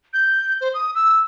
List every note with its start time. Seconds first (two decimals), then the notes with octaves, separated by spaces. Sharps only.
0.13 G6
0.61 C5
0.74 D#6
0.95 E6